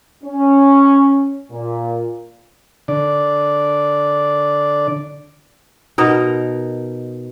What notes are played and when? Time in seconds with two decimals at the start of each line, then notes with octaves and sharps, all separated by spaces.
0.24 C#4
1.50 A#2
2.88 D3 D5
5.98 B2 D#4 A#4